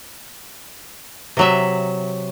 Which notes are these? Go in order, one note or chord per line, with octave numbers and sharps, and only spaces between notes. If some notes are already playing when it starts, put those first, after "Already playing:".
C3 F#3 E5